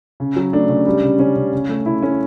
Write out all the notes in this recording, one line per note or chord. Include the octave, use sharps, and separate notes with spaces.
C#3
F#3
A3 D4
C#3
G3
C#3
C#3 C#4
C#3
C#3
A3
C#3 E4
A3 C#4